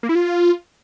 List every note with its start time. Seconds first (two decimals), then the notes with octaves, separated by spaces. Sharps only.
0.03 A#3
0.09 E4
0.15 F4